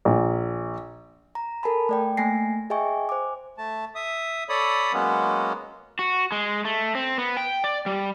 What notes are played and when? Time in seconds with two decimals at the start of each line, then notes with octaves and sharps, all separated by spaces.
0.05 A#1
1.35 A#5
1.63 A4 A#4 G#5 A5 B5
1.89 A3 D5 G5
2.17 A3 A#3 G#5 A#6 C7
2.70 G#4 D#5 E5 G5 G#5 C#6
3.09 C5 G#5 D6
3.58 A3 A5
3.95 E5 D#6
4.49 A4 C#5 D5 B5 D#6
4.93 F#3 G#3 A#3 B3 C#4
5.99 F#4
6.32 G#3
6.65 A3
6.95 C4
7.18 B3
7.37 G5
7.64 D5
7.86 G3